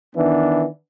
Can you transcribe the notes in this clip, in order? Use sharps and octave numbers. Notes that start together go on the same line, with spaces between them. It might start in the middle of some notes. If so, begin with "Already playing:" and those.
D#3 E3 B3 D4